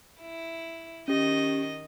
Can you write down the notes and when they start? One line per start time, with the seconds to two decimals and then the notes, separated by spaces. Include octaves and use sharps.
0.21 E4
1.08 D#3 C#4 G4 D#5